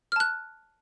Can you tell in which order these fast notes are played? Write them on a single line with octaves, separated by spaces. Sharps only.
F6 A5 F#6